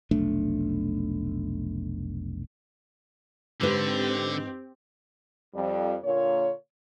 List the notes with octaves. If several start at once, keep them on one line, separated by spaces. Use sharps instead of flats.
F1 B1 A3 D4
G#2 D3 C4 G4 B4
F2 G3
A#2 D3 A#3 F4 C#5